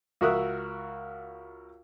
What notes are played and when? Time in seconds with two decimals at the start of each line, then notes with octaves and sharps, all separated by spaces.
0.21 C#2 F#4 A#4 E5 D#6 F#6